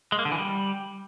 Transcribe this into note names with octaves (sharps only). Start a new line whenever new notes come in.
G#3
A#3
D3
E3
G3